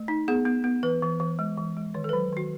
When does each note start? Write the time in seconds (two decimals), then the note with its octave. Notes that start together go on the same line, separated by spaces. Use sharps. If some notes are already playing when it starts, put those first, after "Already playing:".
Already playing: A3
0.08 D#4
0.28 B3 G#4
0.45 B3
0.64 B3
0.83 E3 B4
1.02 E3
1.20 E3
1.39 G#3
1.57 E3
1.77 G#3
1.94 D#3 C#5
2.04 A4
2.09 F#3 B4
2.32 D#3 F#4